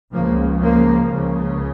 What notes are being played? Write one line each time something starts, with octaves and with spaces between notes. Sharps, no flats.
C#2 C#3 F3 A#3
F3 A#3
C#2 C#3